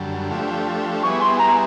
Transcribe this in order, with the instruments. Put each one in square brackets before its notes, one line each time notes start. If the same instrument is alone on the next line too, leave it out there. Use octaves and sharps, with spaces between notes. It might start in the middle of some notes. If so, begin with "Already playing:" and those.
Already playing: [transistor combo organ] F#2 D3 G3
F3 A3 D4 G4
[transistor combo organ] G3 B3 E4 G#4 [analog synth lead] C#6
[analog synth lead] C6
A#5